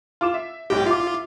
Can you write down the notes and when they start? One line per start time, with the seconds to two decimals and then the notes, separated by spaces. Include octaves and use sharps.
0.21 F4 D6 E7
0.34 E5
0.70 B1 G#2 F#4 G4
0.86 F4 E5 D6